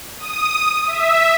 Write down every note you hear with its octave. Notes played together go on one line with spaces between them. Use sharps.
D#6
E5